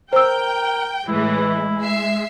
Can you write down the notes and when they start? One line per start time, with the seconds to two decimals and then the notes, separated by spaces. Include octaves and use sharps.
0.13 A#4 C5 G5 E6
1.08 A2 E3 G#3 E4
1.82 E5 C7